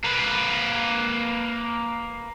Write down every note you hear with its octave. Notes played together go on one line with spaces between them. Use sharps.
A#3 B4